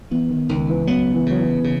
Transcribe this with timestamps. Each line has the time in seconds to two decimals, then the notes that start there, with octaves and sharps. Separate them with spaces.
0.11 E3 B3
0.30 D#3
0.49 C#2 D#3
0.69 E3
0.87 F#3 B3
1.14 E3
1.26 C#3 F#3
1.38 E3
1.64 C#3